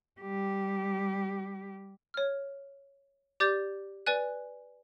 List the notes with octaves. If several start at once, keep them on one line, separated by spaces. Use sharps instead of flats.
G3 G4
C#5 F6
G4 D5 D6 G6 A6
B4 D5 G#5 F#6